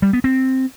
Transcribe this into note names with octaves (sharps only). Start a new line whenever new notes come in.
G3
B3
C4